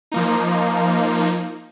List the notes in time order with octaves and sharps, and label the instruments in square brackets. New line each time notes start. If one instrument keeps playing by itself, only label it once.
[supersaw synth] F3 A#3 D#4